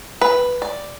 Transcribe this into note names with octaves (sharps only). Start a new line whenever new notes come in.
B4
D5